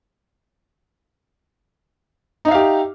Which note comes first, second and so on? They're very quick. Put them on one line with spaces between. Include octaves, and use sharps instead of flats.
D#4 E5 F5 G4